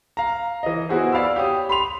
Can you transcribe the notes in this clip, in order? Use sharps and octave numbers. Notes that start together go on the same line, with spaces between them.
F5 A#5
E3 D#5
B3 E4 F#4 G#4 C5
D5 F5 B5 E6
G4 C#5 D#6
B5 C6 F7